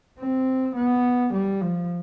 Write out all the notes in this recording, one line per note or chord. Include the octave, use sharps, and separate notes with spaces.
C4
B3
G3
F3